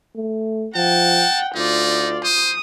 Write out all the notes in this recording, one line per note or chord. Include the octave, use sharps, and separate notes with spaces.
A3
F3 F#5 G5 A5
D2 D#4 F4 D5
C5 D#6